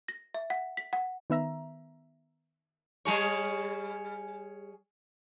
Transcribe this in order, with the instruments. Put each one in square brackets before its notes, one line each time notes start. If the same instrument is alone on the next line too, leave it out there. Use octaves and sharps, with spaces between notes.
[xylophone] A#6
E5
F#5
B6
F#5
[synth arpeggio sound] D#3 B3 E5 A#5
[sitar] G3 G#4 C#5